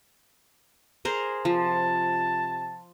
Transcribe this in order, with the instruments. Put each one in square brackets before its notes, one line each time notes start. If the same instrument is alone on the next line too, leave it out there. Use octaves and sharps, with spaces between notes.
[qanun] G#4 A#4 C5
[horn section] C3 A5 [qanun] F3